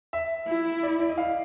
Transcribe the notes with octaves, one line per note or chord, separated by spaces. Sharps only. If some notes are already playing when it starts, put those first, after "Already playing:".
E5
E4
D5
D5
D#5
F5